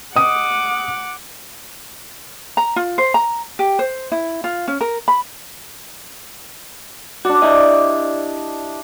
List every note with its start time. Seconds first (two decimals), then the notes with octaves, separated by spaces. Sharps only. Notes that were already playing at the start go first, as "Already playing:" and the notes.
0.16 D#5 F#5 D6 D#6
2.57 A#5
2.76 F4
2.98 C5
3.14 A#5
3.59 G4
3.79 C5
4.12 E4
4.44 F4
4.68 C#4
4.81 A#4
5.08 B5
7.25 D4 F#4 D5
7.42 E4 G4 D#5